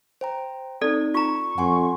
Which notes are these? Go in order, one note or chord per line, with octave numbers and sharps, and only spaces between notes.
C5 G5 A#5
C4 D#4 A4 D5
F4 A#5 C#6
F2 F#5 G#5 C6